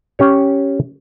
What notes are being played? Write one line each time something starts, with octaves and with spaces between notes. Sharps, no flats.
C#4 G4 C#5